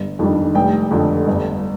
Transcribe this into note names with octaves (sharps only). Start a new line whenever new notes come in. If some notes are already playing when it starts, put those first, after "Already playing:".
Already playing: G1
F2 D#3 G3 D4
F1 G5
F2 D3
G1